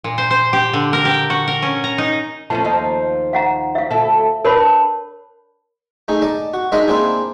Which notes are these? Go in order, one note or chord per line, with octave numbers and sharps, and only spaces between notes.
A#2
C5
C5
G4
D3
A#4
G4
F#4
A#4
C#4
A#5
D#4
F3 A3 C#4 A5
D#2 F3 D#4
F5 F#5 A#5
E5 F5
D2 E4 A4
D4 A#4 B4 C#5 B5
A3 D#4 G#4
D5 D#5 A5
F#4
G#3 D4 D#4 A#4 D#5 E5
A#3 C4 D4 E4 G#4